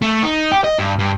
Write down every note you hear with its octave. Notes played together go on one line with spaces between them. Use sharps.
A3
D#4
G4
D#5
G2
G2